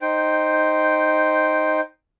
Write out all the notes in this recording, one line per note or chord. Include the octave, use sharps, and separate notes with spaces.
D#4 C5 G5